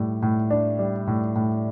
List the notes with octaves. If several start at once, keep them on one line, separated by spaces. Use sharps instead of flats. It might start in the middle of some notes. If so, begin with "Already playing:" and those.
Already playing: A2 G3
A2
D4
G3
A2
A2